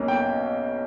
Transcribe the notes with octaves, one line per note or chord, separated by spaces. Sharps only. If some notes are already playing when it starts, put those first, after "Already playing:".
Already playing: B1 B2 A#3 C#4
G5